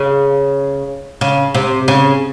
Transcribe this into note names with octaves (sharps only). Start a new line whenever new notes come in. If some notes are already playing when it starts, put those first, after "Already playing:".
Already playing: C#3
C#3
C3
C#3